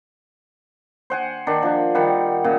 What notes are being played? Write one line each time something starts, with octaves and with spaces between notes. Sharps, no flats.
C5 F#5 G#5
D#3 D4
F3 D4
D#3 G3 F#5
A#2 C#3